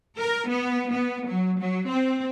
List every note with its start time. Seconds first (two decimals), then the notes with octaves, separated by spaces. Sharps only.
0.18 A#4
0.49 B3
0.92 B3
1.28 F#3
1.60 F#3
1.89 C4